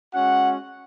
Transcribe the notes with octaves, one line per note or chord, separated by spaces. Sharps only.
G#3 C#4 F#4 F#5